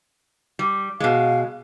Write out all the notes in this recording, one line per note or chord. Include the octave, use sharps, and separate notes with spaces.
G3
B2 G#3 F5